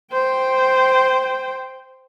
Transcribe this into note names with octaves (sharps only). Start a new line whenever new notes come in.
C5 G5